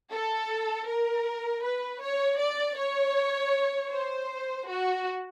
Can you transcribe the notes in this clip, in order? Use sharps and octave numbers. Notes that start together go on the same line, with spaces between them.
A4
A#4
B4
C#5
D5
C#5
C5
F#4